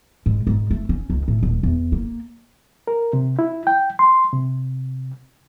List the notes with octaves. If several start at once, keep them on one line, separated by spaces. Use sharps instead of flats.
G#2
G#2
A3
C#4
C#2
A2
D#1
E2
A#3
A#4
C3
E4
G5
C6
C3